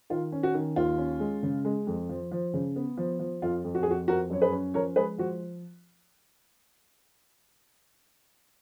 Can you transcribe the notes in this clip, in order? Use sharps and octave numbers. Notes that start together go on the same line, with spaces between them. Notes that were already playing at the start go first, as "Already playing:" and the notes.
D#3 F4
C#4
F#4
D#3
D#2 F4
C#4
G#3
C#3
G#3
F2
F3
F3
C#3
B3
F3
F3
F2 F4
F2
F#4
G#4
F2 F#4
F3 F#4 A#4
F#2 C#5
G#4 B4
C#4
F3 A#4 C#5
G#3 G#4 B4
F3 F#4